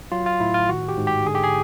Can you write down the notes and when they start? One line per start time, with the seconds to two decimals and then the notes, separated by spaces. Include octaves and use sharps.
0.12 F#3 F4
0.26 F4
0.40 A2 E4
0.54 F4
0.69 D#3 F#4
0.88 G4
0.97 G#2
1.07 G4
1.26 D3 G#4
1.35 G4
1.43 G#4